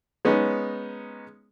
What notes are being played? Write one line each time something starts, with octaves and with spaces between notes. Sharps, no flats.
G#3 B3 C#4 D#4